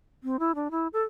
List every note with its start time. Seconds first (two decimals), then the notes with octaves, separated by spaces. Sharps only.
0.24 C4
0.39 E4
0.55 D4
0.71 E4
0.93 A4